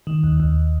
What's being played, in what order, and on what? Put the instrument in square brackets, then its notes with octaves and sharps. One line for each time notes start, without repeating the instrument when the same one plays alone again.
[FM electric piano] D#3
D#2
D#2